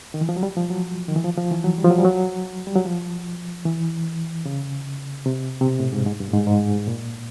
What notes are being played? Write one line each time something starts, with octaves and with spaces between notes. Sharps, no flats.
D#3
E3
F3
F#3
G3
F3
F#3
D#3
E3
F3
F3
E3
F#3
G3
F3
F#3
G3
F#3
G3
F#3
F3
E3
C#3
C3
C3
B2
A2
G#2
G#2
G2
A2
G#2
G#2
A#2